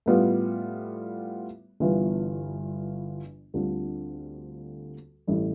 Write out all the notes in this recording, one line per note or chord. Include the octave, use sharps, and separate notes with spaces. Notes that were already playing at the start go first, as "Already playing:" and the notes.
A2 G3 B3 F4
G1 G2 E3 B3 F4
D2 D3 G3 C4 F4
A1 A2 G3